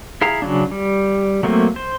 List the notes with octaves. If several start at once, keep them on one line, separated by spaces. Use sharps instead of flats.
E4 G#4 F5 A#5
C#3 F#3 D4
G3
F#3 A3 A#3 C4
C5